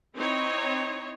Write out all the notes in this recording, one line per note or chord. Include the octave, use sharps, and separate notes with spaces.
C4 D#4 E4 C#5